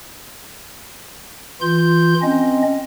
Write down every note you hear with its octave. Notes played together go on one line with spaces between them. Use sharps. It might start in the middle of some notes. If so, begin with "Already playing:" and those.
E3 F4 C6 G6
C4 C#4 D#5